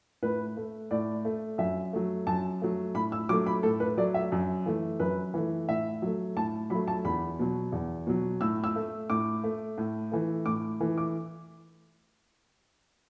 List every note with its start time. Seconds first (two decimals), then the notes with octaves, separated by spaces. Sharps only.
0.23 A2 B4
0.57 A3
0.91 A2 D5
1.25 A3
1.58 F#2 E5
1.93 F#3 A3
2.27 F#2 A5
2.62 F#3 A3
2.95 A2 B5
3.12 E6
3.29 F#3 D6
3.33 A3
3.46 B5
3.63 A2 A4
3.80 B4
3.97 F#3 A3 D5
4.14 E5
4.32 F#2
4.66 E3 A3
4.99 F#2 B4
5.34 E3 A3
5.69 A2 E5
6.02 F#3 A3
6.36 A2 A5
6.70 F#3 A3 B5
6.88 A5
7.05 E2 B5
7.39 B2 F#3
7.72 E2
8.07 B2 F#3
8.41 A2 E6
8.64 E6
8.76 A3
9.10 A2 D6
9.44 A3
9.78 A2
10.12 E3 A3
10.46 A2 D6
10.80 E3 A3
10.98 D6